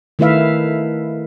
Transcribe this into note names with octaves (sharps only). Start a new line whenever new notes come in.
D#3 A3 E4 B4 E5 F5